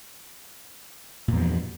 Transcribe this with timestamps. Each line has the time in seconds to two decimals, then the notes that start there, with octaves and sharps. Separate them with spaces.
1.28 A#2
1.32 E2
1.37 F3
1.41 G2